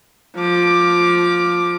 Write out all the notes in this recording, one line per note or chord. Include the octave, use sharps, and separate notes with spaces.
F3 D6